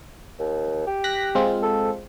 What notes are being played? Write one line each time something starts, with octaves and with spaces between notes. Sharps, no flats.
D#2
G4
F#6 A#6 B6
G#3 C4 F4
A4